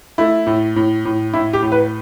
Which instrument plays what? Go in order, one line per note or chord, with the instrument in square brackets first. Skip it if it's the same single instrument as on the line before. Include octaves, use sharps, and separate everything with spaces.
[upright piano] A3 E4
A2
A2
A2
A2 E4
G4
A2
B4